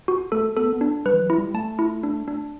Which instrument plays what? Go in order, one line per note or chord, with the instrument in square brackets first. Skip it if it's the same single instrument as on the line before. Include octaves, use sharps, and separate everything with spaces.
[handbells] F#4
[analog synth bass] A3 [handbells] A4
[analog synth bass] B3 [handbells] A4
[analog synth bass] B3
[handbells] D4
[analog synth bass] G3 [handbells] B4
[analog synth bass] E3
F#3
[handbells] E4
[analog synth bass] G3
[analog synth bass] A3 [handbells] A5
[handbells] E4
D4
D4